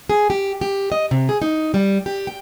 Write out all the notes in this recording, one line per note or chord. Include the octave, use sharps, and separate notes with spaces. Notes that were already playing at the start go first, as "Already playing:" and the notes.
G#4
G4
G4
D#5
C3
G#4
D#4
G3
G4
G5